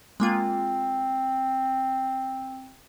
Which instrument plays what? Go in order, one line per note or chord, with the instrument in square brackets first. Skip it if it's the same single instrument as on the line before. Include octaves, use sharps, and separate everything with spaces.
[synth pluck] G#3 A#3 F4 [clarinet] C4